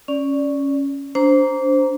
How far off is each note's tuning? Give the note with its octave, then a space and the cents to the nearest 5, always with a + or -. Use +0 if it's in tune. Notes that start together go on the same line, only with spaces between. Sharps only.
C#4 +0 D5 -5
D4 -25 C5 +0 A#5 +0